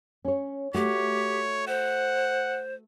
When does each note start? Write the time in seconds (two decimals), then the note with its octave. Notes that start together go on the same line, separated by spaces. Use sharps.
0.25 C#4 C#5
0.74 A3 F#4 G4 C#5
1.68 C5 F#5